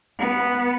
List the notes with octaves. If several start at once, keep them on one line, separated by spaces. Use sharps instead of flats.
B3